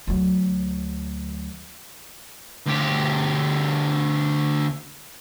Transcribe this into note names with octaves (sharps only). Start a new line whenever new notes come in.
D2 F#3
D2 G4